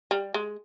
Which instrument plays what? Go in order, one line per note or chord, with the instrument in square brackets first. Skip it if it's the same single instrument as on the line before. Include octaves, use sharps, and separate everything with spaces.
[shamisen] G3
G#3